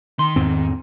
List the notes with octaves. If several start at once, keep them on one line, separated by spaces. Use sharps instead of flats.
D#3 C6
E2 G#2 C4